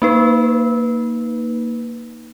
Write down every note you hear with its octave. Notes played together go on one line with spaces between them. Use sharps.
A#3 D#4 B4